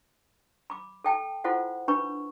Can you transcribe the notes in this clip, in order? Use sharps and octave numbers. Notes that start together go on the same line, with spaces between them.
B5 D6
A4 G5 A5
E4 F4 A4 C5 F#5
D4 B4 B5 C#6